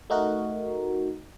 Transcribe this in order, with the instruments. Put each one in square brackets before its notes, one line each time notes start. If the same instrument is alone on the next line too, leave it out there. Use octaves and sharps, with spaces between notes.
[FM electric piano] A3 D#4 F#4 A#4